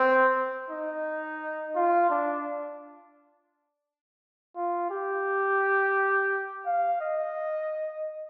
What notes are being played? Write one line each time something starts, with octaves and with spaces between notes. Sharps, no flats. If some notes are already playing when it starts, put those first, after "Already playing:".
Already playing: C4
D#4
F4
D4
F4
G4
F5
D#5